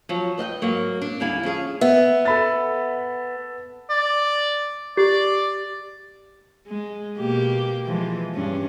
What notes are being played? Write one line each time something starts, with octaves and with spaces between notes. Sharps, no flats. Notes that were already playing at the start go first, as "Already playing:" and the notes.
F3 F#3
B4 D#5 F#5 G5
G#2 F#3 A#3
D4
D#2 D3 G3 E4 F5 G#5
F3 C#4 G#4 F5
B3 E5
A4 B5 A6
D5
G4 D5
G#3
B2 A#3 G4
E3 F3 G#3
G2 C#4 D4